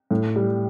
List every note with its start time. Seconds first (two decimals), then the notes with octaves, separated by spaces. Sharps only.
0.11 A2
0.36 G3